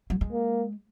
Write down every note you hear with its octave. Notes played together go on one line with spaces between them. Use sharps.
F#3
G#3
A#3